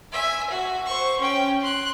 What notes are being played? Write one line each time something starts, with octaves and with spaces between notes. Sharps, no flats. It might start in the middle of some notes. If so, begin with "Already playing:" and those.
E5 G#5
F#4
C5 C#6
C#4 G5
C6 F#6